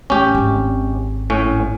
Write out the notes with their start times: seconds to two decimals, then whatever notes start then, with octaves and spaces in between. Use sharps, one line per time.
0.10 A1 A3 C#4 G4
0.35 D#1 G#1
1.30 A2 C#4